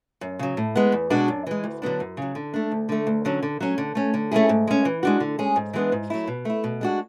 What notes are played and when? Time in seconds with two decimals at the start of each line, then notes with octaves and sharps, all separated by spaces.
0.21 F#2
0.39 C#3 F#3
0.57 A2
0.75 G#3 B3
0.92 E2
1.10 B2 G#3 D4 F#4
1.28 F#2
1.47 E3 G#3
1.64 D2
1.82 D3 F#3 B3 D4
2.00 F#2
2.17 C#3 F#3
2.35 D3
2.54 A3 D4
2.71 D2
2.89 D3 A3
3.07 D2
3.25 D3 F#3 C#4
3.43 D3
3.60 F#3 C#4
3.78 D3
3.95 A3 C#4
4.14 D3
4.31 A3 C#4 E4 G#4
4.49 G#2
4.67 G#3 C#4
4.85 E3
5.03 G#3 D4 F#4
5.20 D3
5.39 G#3 C#4 G#4
5.56 G#2
5.73 E3 G#3 B3 D4
5.92 G#2
6.10 F#3 A3 E4
6.28 B2
6.45 A3 E4
6.64 B2
6.81 G#3 D4 F#4